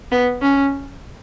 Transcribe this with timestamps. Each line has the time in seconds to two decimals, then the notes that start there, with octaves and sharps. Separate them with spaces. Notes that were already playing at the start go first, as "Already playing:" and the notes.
0.12 B3
0.42 C#4